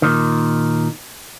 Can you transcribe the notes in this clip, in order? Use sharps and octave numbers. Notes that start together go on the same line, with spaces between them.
A#2 D#3